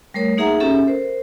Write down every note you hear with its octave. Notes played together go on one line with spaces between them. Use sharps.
G3 A3 A#4 C#5
A#3 D#4 G#4 E5 F#5 A#5
C#4 G4 A4 E5
A#4 C5